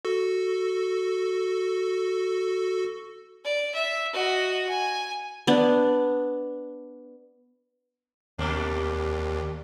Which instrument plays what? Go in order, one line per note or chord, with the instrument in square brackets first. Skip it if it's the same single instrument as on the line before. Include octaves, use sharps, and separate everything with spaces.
[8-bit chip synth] F#4 A4
[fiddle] D5
E5
F#4 D#5
G#5
[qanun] B3 D4
[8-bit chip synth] D#2 [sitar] A#2 G3 D4